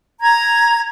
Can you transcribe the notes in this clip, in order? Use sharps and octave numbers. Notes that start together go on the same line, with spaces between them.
A#5 G#6